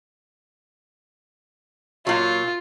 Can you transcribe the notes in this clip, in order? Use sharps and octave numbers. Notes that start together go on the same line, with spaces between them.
A#2 F#3 F4